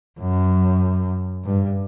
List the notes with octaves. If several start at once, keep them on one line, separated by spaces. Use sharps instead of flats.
F#2
G2